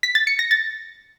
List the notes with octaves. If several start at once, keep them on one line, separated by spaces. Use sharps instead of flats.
B6
A6
C#7
A#6
A6